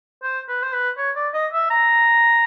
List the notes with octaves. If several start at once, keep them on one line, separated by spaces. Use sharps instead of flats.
C5
B4
C5
B4
C#5
D5
D#5
E5
A#5